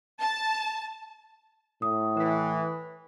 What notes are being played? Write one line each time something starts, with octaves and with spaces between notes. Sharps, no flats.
A5
A2 D#6
E3 B4 B6